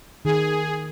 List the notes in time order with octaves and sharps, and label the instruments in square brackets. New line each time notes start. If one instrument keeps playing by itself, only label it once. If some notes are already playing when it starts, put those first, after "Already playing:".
[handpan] D#3 [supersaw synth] G#4